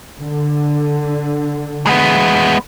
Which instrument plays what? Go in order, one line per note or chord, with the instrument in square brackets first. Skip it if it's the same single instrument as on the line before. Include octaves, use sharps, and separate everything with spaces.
[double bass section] D3
[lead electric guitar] G#3 B3